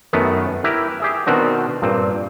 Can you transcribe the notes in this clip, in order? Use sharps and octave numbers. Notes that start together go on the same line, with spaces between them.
F#2 D#3 A3 B3
E4 G4 A#4 B4
G4 G#4 E5
B2 D#3 C4 D4 F#4
G2 A#2 C4